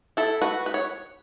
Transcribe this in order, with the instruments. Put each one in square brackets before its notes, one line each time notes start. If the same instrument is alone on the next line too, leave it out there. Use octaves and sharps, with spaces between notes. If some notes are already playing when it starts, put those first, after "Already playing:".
[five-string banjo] E4 A4
F#4 B4
B4
C#5